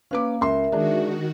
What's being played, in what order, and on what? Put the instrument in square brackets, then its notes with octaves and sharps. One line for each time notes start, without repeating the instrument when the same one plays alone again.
[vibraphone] A#3 F5 [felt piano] C#4 B4 D6
[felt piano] C#2 C6 [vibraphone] A#4 E5
[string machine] D#3 F#4 [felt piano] G#3 D4